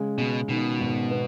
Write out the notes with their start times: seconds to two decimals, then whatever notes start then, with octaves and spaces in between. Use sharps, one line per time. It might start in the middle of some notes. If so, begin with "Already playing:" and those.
Already playing: C#3 G#3
0.18 B2 G#3
0.48 B2 D#3
0.80 G#1
1.11 B3